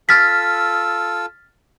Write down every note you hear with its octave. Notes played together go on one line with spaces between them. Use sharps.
F4 A4 E6 F6 A6 B6